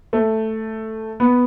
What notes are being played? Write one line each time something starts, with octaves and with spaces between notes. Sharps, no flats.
A3
B3